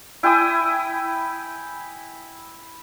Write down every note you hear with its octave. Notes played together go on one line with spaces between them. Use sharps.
E4 G5 G#5 D#6